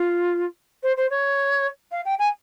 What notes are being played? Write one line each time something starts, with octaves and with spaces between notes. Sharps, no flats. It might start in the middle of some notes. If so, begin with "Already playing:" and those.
Already playing: F4
C5
C5
C#5
F5
G5
G#5